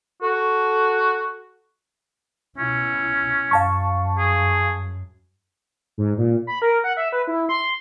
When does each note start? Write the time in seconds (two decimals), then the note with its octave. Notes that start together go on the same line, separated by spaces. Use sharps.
0.22 F#4 A4
2.58 B2 C#4 E4
3.51 F#2 F5 A5 C#6
4.19 G#4
5.98 G#2
6.18 A#2
6.47 B5
6.62 A#4
6.84 F#5
6.97 E5
7.12 B4
7.27 E4
7.49 C6